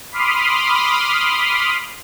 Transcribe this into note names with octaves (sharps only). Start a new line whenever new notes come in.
B5 C6 D6 D#6 F6